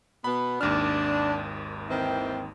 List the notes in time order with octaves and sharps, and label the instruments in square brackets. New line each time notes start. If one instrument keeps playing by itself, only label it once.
[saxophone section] B2 B3 [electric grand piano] B5
[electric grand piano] G#1 D#2 F6 [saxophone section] D4
[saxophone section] D#3 E3 C4